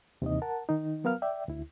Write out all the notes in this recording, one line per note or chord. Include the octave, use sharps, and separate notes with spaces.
D#2 C3 D#3 E3 D#4 D#5
A#4 F#5 A5
D#3 D#4
F#3 B3 A#4 F5 F6
D5 E5 G5
D2 E4